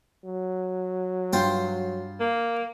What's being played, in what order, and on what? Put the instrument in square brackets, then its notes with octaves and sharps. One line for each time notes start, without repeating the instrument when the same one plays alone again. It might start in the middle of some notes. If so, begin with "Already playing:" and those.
[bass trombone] F#3
[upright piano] G2 G6 [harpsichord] F4 C5 G5
[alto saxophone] A#3